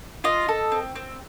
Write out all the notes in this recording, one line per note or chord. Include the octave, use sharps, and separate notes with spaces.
F4 D#5
A4
C4
C4